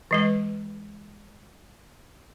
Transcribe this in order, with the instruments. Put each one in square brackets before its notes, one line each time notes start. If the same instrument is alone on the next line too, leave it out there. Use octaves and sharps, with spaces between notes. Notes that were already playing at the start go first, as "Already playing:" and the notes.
[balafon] E3 G#3 B4